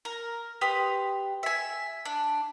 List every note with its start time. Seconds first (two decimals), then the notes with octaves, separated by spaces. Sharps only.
0.05 A#4
0.61 G4 B4 C6 D#6
1.43 E5 G#5
2.05 D4